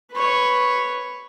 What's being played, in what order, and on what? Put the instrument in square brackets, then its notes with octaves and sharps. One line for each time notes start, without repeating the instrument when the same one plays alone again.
[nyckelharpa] B4 C#5